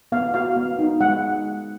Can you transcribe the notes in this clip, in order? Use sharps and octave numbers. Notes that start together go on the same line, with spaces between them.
B3 F5
F#4 F5
B3
D#4
G#3 F#5